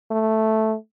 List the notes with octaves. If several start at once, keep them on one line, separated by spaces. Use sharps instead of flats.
A3